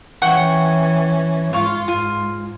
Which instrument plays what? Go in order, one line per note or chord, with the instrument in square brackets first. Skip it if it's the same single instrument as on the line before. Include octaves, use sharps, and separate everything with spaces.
[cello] E3 C#4 [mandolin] F#5 G5 C#6
[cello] G#2 F4 [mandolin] F5 C#6
[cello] G#2 [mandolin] F4